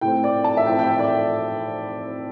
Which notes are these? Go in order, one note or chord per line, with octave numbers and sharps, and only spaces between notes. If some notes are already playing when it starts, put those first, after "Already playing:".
A2 A3 C4 G5
D5
A5
E5
A2 A3 C4 G5
G5
E5
D5